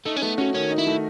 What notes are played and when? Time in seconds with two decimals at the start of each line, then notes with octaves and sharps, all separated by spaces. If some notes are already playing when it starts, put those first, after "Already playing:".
0.06 A3 D#4
0.17 C#4
0.22 A3 B3
0.38 C#4 F#4
0.54 D#3 C#4
0.70 D#4
0.78 E4
0.87 A3